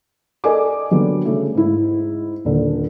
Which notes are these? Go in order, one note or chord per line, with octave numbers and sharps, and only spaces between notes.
A4 A#4 D5 D#5 G#5 D6
D3 F#3 G3 B3
C#3 A3
G#2 E4
D#1 D3